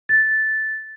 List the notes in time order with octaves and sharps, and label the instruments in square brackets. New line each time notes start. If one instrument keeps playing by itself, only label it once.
[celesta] A6